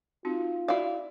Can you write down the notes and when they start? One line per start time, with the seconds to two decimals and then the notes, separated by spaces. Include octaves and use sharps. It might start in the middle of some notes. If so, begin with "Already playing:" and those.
0.25 C4 D#4 F4 F#4
0.68 E4 F#4 D5 F5